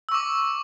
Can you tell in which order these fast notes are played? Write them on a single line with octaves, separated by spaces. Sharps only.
E6 C#6 D6